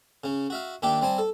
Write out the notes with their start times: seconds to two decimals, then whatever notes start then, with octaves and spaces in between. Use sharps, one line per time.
0.24 C#3 C#4
0.50 F#4 E5 F5
0.82 D#2 D4 G4 E5 G5 D6
1.01 G3 C4 G#5 A5
1.18 A4